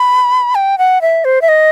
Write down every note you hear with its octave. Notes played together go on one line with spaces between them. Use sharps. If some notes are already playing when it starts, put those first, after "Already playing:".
Already playing: B5
G5
F#5
E5
C5
E5
D#5